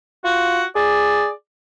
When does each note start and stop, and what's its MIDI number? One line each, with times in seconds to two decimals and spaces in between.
0.24 0.62 65
0.24 0.65 66
0.76 1.31 68
0.76 1.31 74